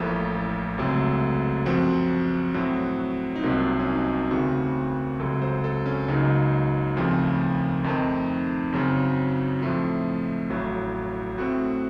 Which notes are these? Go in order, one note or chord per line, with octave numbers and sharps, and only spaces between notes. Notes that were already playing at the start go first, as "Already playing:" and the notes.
Already playing: A1 A2 F3 A#3 A4
C#2 C3 F#3 A3
F#2 F3 C4 F#4
A2 F#3 C4
D#4
C2 C3 F#3 A#3 F4
C#4
D#4
D#2 C#3 A3 C4 F#4
C#2 C3 F#3 A4
C5
A4
C#4
C#2 C#3 F#3 A#3 D#4
D#2 C#3 F3 A3 C4
F2 D#3 A3 C4 D#4
F#2 C#3 F#3 C4
A2 F3 A3 C4 F4
A1 A2 F#3
A2 A3 C4 F#4